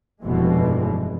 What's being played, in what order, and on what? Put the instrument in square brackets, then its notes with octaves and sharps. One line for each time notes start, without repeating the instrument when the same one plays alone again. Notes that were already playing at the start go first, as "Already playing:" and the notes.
[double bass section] F1 G2 B2 E3 G#3